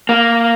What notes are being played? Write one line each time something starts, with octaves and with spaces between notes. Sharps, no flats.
A#3